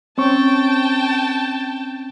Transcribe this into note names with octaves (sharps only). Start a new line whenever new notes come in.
C4 C#4 G5 A5 C#6